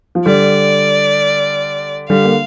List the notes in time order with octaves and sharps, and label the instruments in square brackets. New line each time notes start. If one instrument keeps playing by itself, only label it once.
[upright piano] F3
[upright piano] D3 G3 [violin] D5
[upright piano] D3 G3 [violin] F5
[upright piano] A#3